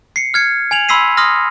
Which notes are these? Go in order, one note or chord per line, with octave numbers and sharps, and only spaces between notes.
C7 C#7
F6 G#6 C#7
G#5 G#6 F7 F#7
B5 C6 E6 B6 C7 D#7
C6 D#6 F6 A#6